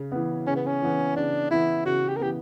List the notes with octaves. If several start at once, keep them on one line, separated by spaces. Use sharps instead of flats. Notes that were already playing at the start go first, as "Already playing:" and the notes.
Already playing: C#3
E3 B3
C#3 C#4
B3
C#4
E3 B3
C#3 D4
E3 B3 E4
C#3 F#4
G4
A#4
E3 B3 G4